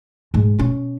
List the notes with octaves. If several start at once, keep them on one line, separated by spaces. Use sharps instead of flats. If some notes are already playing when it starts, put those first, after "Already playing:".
G#2 G#3
B2 C#4